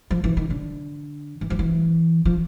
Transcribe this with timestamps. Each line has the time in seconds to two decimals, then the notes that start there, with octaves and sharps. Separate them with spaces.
0.11 F3
0.24 E3
0.37 D#3
0.50 D3
1.41 E3
1.50 F3
1.59 E3
2.25 F3